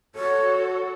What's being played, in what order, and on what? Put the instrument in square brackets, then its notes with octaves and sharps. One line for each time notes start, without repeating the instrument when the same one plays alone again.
[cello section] F#4 A4 [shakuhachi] C#5